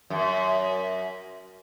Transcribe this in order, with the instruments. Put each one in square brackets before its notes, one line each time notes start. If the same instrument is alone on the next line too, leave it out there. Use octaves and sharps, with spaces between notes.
[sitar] F#2